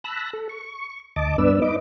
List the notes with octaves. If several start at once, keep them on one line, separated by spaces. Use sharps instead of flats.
A5 B5 E6 F#6 A#6
A4
C#6
D2 D#5 A5 D6
G2 B3 D4 B4 D5 E6
D#4 B4 D#5 D6